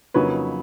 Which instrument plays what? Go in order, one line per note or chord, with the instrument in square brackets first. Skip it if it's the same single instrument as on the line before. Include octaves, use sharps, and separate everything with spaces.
[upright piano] F2 C#3 F#3 A#3 D#4 B4 C#5